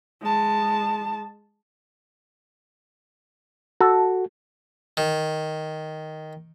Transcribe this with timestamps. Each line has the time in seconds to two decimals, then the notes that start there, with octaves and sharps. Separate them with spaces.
0.21 G#3 A5
3.81 F#4 A4
4.97 D#3